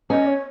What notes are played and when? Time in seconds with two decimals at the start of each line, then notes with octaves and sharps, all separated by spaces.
0.10 C#4 D#5
0.27 C#5